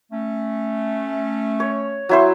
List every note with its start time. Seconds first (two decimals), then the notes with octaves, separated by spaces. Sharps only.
0.12 A3 C#4
1.60 C#5
2.09 F#3 E4 C5